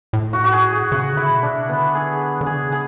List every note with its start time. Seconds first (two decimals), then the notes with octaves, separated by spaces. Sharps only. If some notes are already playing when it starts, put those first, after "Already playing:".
0.13 A2
0.33 F#4
0.44 F#4
0.53 G#4
0.72 G#4
0.92 C#3 F#4
1.11 D3
1.17 E4
1.30 B2
1.43 D4
1.49 C#3
1.69 D3 B3
1.95 G#4
2.41 D3
2.46 C#3 G#4
2.72 G#4